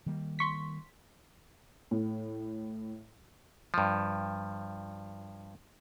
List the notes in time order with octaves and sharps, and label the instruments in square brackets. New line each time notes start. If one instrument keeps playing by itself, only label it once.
[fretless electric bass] D#3 G3 A#3
[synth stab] C6 C#6 B6
[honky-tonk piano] A2
[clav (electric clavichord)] G2 F3